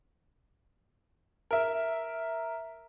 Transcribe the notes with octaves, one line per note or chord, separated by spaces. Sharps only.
A#4 E5